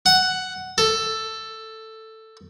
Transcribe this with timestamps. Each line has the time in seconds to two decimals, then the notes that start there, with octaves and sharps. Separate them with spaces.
0.06 F#5
0.78 A4